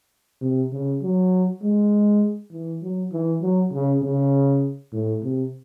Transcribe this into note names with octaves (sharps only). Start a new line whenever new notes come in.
C3
C#3
F#3
G#3
E3
F#3
E3
F#3
C#3
C#3
A2
C3